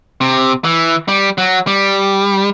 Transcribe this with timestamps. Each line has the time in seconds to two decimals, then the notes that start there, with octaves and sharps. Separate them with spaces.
0.21 C3
0.64 E3
1.08 G3
1.38 F#3
1.67 G3